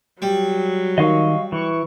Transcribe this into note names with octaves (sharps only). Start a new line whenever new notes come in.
F#3 G3
D#3 D#5 F5 C#6
E3 C#6